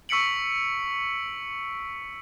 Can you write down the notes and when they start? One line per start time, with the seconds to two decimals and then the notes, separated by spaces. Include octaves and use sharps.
0.09 C#6 E6 B6 C#7 D7 F#7